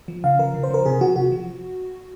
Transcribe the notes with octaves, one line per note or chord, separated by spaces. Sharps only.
F3
C#3 F5
F3 A#4
C#3
C5
F3 A#4
C3 G#4
F3 F#4
C3 F#4
F3